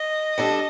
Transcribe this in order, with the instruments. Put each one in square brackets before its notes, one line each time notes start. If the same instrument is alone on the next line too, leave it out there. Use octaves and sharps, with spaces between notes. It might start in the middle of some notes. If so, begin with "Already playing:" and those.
Already playing: [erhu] D#5
[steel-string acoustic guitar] G3 D4 A4